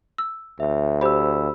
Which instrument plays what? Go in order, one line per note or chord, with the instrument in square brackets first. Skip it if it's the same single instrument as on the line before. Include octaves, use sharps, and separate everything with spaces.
[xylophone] E6
[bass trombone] D2 [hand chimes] E5
[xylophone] G4 C5 [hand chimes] B5 E6